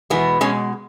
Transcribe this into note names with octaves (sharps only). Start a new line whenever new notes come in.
E2 B2 G#3 B3
B2 G#3 C#4